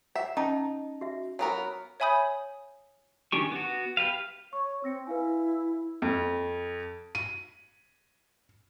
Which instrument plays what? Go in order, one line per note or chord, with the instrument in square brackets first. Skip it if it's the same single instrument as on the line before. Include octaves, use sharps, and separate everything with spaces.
[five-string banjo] E5 [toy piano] F#5
[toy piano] C#4 D#5 A5 [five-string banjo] D#4
[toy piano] F#4 E5
[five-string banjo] F#3 B3 A#4
[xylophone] C#5 E5 G#5 B5 D#6 G6
[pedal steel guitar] D#3 C#4 D4 G4 C#6
B3 F#4
G4 B4 F5
[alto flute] C#5 [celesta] C#6
[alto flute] C4 [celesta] E6 A#6 C#7
[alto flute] E4 [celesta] B4 F5 G#5
[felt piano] F2
D#7